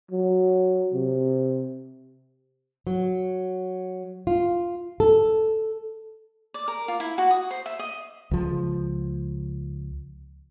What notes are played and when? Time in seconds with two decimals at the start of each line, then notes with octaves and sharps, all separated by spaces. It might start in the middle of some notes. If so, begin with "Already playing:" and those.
0.11 F#3
0.94 C3
2.87 F#3
4.27 F4
5.00 A4
6.54 D5
6.68 A#4
6.88 F4
7.00 E4
7.18 F#4
7.31 D#6
7.51 C5
7.66 E5
7.79 D#5
8.31 C#2 F3